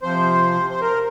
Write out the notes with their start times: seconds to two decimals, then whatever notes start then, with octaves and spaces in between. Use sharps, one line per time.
0.02 C3 F3 C5
0.70 C5
0.81 A#4